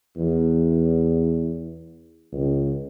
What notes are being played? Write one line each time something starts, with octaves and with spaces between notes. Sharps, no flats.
E2
C#2